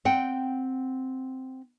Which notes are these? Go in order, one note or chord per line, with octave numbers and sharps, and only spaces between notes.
C4 F#5 G5